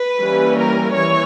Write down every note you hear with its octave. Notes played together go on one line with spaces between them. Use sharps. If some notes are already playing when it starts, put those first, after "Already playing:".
Already playing: B4
E3 G3 A#3 C#4
A#4
E3 C#5